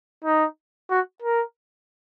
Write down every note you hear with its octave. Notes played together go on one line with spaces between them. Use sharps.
D#4
F#4
A#4